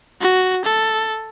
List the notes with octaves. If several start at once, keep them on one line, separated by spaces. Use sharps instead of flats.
F#4
A4